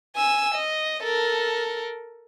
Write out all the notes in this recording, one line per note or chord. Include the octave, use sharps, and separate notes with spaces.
G#5 E6
D#5
A4 A#4